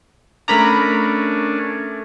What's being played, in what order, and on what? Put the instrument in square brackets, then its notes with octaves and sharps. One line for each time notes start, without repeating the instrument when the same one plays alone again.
[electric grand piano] A3 A#4 D6 [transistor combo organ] C#4 D4 [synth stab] A#5 B5